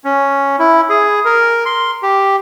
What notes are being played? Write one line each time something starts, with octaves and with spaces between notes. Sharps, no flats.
C#4
E4
G#4
A#4
C6
G4